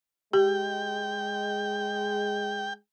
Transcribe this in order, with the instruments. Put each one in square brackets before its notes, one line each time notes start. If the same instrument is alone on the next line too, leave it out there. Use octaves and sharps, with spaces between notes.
[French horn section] G#3 [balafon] G4 [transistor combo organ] G5